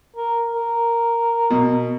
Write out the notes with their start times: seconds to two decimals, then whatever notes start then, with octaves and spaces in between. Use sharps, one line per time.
0.16 A#4
0.55 A#4
1.50 B2